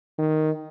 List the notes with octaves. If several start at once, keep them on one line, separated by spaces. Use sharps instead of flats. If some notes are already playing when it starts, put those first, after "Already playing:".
D#3